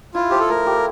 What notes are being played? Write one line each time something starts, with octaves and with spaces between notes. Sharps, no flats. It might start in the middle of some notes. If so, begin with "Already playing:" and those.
E4 F4
F3 G4
A4
A3 A#4
G4